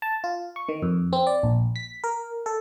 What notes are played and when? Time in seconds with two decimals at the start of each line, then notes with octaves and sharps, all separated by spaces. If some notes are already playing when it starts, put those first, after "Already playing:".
0.02 A5
0.24 F4
0.56 C#6
0.69 D#3
0.82 F2
1.13 C4
1.27 D5
1.43 A#1
1.76 B6
2.04 A#4
2.46 A4